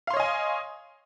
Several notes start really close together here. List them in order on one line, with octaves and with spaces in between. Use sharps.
F5 C6 C#5 D#5 G#5